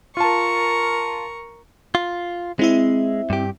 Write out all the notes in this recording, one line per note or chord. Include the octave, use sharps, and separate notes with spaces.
F4 A#4 A5 C#6
F4
G#3 C4 E4 E5
G2 G4